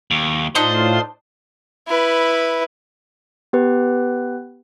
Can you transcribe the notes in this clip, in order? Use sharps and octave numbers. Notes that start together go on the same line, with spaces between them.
D#2
A2 D4 D#4 F4 C5 D#5
E4 B4
B3 G4 B4